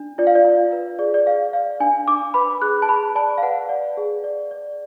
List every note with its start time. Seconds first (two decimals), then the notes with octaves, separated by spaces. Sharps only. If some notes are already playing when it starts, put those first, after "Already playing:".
Already playing: D4
0.18 F4 D5
0.27 F5
0.35 D5
0.45 F4
0.72 B4
0.99 G#4 D5
1.14 D5
1.26 G#4 F5
1.53 D5 F5
1.80 D4 G#5
2.08 D4 D6
2.34 B4 B5
2.62 G#4 F#6
2.82 A5
2.89 G#4 B5
3.15 D5 A5
3.38 F5
3.43 B4 F#5
3.69 D5
3.97 G#4
4.24 D5
4.51 D5